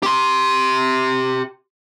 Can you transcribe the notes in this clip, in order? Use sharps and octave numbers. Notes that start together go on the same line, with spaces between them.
G4 C6